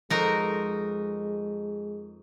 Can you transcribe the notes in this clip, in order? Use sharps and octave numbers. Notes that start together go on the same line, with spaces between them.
F2 G#3 D#4 F#4 A#4 C5